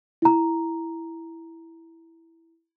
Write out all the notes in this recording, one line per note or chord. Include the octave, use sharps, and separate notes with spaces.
E4 A#5